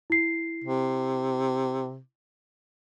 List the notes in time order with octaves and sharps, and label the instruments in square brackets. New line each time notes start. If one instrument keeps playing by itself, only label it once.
[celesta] E4 C7
[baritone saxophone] C3